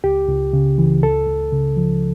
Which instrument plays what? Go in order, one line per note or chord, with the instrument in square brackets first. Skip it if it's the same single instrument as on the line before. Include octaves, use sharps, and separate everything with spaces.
[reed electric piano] C#2 G4
C#2
C#3
E3
C#2 A4
C#2
C#3
F3